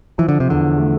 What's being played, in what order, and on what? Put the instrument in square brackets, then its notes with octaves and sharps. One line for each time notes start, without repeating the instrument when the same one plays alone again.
[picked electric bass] E3 [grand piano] F3
[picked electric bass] D3
C3
[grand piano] E2 [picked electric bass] D3
[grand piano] A3